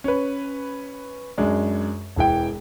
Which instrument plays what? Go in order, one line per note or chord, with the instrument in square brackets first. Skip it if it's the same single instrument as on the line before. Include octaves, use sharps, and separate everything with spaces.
[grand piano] C#4 B4
F#2 G#3 D4
E1 E3 G5